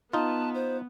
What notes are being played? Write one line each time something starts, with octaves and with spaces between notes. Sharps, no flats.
B3 D#4 F4 A5
C5